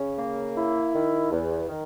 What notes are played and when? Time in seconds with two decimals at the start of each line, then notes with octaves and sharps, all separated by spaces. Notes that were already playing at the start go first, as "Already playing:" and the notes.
Already playing: C#3 C#4
0.18 A#3
0.56 E4
0.94 D#3
1.31 E2
1.69 D#3